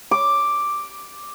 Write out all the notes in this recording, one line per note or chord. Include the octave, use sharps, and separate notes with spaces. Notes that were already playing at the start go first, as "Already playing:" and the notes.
D6